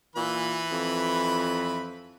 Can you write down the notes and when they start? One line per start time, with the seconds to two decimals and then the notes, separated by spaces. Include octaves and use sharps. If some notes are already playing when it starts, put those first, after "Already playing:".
0.16 A#2 E3 B4
0.71 F2